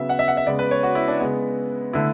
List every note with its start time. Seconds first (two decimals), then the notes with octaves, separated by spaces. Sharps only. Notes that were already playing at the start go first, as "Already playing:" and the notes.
Already playing: C#3 F#3 B3 E5
0.09 F#5
0.19 E5
0.28 F#5
0.37 E5
0.46 C#3 G#3 B3 D5
0.59 B4
0.71 C#5
0.83 F#4
0.95 E4
1.08 D4
1.20 C#3 G#3 B3
1.93 D3 A3 E4